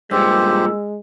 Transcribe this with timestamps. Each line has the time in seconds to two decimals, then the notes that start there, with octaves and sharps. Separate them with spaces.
0.11 G2 A#2 G#3 G4 C5 E6